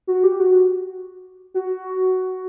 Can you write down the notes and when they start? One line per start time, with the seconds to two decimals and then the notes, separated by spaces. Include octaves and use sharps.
0.07 F#4
0.24 G4
0.40 F#4
1.54 F#4